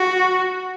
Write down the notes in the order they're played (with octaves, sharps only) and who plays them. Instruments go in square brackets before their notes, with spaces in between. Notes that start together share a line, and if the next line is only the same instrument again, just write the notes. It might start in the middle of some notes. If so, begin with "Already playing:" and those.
Already playing: [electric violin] F#4